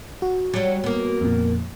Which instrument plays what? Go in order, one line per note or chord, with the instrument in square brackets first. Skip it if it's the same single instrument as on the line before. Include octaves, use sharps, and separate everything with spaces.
[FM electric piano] F#4
[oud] F#3 G3
A#3 B3
[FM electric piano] F2 A#2